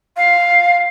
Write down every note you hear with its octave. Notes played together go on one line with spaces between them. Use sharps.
F5